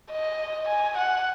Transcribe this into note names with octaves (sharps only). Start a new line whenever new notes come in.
D#5
G#5
F#5